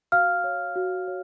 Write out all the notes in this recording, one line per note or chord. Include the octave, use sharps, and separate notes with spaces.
F#4 F5 F6
C#5
F#4
C#5